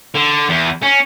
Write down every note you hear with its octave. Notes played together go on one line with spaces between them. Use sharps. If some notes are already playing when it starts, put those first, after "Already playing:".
D3
E2
C#4